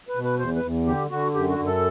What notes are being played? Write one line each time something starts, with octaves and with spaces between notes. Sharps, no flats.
B4
B2
B4
E2 C5
B4
E2
D3 G4
D3 F#4
F#2 G4
F#4
F#2
A4